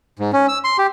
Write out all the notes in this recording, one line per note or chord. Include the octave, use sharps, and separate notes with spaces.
G#2
C#4
E6
C6
G4